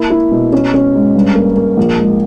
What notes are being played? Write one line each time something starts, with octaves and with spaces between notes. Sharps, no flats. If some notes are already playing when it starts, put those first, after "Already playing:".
Already playing: A#3 E4
E4
B2
C#4
C#4
G#2
G2
A#3
A#3
A#1
G#2